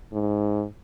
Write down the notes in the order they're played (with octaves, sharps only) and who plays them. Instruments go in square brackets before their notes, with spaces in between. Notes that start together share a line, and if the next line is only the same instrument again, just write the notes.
[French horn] G#2